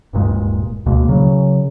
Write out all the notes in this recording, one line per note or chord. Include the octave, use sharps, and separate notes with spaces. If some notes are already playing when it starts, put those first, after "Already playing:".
D1 G2 A#2 G#3
D2 B2 G#3 A#3
C#3 F#3